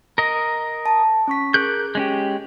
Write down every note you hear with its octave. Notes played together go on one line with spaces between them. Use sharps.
A#4 D#5
A5
C#4 C#6 B6
G#4 A#4 F#6 G6 B6
G#3 C#4 G4